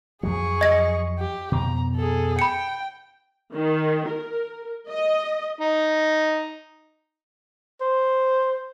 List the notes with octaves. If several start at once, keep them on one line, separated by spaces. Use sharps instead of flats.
F2 F3 F#3 G#4 C#6
D#5 A#6
G4
F2 B2 A#5
G#4 A4
G5 B5 C#7
D#3
A#4
D#5
D#4
C5